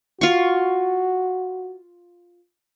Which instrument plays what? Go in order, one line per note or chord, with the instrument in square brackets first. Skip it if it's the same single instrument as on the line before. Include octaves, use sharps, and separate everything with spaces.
[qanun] F4 C#6 [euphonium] F#4